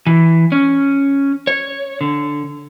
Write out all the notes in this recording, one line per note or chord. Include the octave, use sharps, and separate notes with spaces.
E3
C#4
C#5
D3